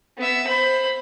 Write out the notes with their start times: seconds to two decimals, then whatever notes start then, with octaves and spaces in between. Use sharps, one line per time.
0.18 B3 E5
0.47 C5 B5